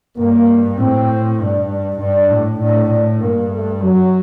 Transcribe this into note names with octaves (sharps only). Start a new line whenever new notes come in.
G2 A#3
A2 C4
G2 D4
D4
G2 D4
A2
A2 D4
A2
G2 A#3
A3
F#2 F#3